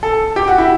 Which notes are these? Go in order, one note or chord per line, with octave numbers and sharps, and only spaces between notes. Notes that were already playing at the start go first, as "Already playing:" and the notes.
A4
G4
F#4
E4